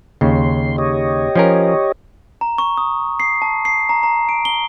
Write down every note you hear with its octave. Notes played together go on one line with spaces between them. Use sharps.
D#2 C#3 C6
G4 C#5 D#5
F3 C#4 A#4
A#5
C#6
D#6
C7
A5
C7
A#5
A#5
D7
G7